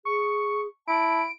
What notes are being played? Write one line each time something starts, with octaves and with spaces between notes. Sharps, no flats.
G#4 C#6
E4 A5 D7